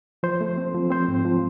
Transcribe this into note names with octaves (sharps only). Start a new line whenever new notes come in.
F3 C5
A3
C4
F3
C4 C5
G#2
F3